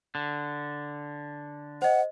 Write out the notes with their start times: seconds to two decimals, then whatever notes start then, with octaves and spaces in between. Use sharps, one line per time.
0.15 D3
1.82 C5 D#5 F#5